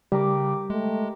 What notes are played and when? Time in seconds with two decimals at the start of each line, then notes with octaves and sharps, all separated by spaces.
0.12 C#3 G3 G4 A#4 D6
0.70 G#3 A3